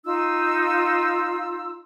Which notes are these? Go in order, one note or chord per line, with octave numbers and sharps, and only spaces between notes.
D#4 F4 E6